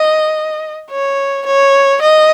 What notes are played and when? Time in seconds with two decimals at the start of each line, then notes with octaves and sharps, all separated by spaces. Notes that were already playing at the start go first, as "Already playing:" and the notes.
Already playing: D#5
0.91 C#5
1.46 C#5
2.02 D#5